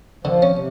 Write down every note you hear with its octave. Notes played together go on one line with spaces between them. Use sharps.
D3 F3
C#4
C3